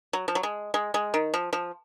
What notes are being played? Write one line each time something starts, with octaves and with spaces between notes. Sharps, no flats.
F#3
F3
F#3
G#3
G#3
G#3
D#3
F3
F3